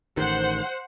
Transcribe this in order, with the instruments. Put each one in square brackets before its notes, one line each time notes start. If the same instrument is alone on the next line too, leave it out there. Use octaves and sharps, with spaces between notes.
[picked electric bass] A1 D#3 [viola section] C5 F#5